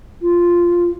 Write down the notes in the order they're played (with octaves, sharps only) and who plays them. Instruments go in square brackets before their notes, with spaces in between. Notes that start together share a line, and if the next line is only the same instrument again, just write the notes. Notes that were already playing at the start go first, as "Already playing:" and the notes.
[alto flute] F4